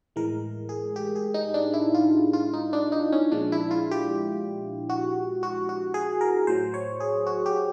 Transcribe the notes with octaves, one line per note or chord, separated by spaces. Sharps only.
A2 E3 G#3 A#4
G#4
G4
G#4
D#4
D4
E4
F4
F4
D#4
D4
D#4
C#4
A#2 F3 G#3 D4
E4
F4
G4
F#4
F#4
F#4
G#4
A#4
A2 F#3 C5
C#5
G#4
F#4
G4